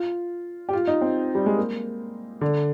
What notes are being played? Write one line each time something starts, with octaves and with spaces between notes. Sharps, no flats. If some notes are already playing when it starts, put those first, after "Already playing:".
Already playing: F4
G4
F4
D#4
C4
G3
G#3
A#3
D3